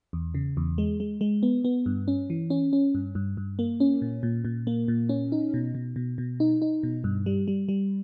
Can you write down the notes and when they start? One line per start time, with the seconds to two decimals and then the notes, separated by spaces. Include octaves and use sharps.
0.13 E2
0.34 C#3
0.57 E2
0.78 G#3
1.00 G#3
1.21 G#3
1.43 B3
1.64 B3
1.86 G2
2.08 C#4
2.30 E3
2.50 C#4
2.73 C#4
2.95 G2
3.15 G2
3.37 G2
3.59 A#3
3.80 C#4
4.02 A#2
4.23 A#2
4.45 A#2
4.67 A#3
4.88 A#2
5.09 C#4
5.32 D#4
5.54 B2
5.75 B2
5.96 B2
6.18 B2
6.40 D#4
6.62 D#4
6.83 B2
7.04 G2
7.26 G3
7.48 G3
7.69 G3